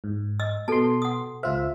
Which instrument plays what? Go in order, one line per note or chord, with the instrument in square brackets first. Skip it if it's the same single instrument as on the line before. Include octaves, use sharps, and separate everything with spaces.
[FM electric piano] G#2
[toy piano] D#5 E6
[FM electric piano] B2 C6 [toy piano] A4 A5
[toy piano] F#5 D#6
[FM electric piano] C#2 F4 E5 [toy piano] C5